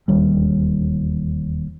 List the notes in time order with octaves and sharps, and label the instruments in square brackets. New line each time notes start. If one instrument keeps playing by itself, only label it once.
[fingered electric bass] E1 D#2 G3